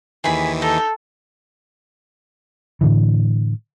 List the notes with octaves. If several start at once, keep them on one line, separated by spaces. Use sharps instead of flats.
D#2 D#3 E3 G#4 B5
D#4 A4
A2 D3 E3